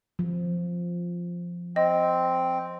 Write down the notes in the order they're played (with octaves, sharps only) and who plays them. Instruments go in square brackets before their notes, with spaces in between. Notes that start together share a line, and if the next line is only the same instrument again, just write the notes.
[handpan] F3
[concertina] C4 [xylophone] D#5